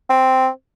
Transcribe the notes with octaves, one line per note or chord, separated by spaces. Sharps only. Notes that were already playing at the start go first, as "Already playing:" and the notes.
C4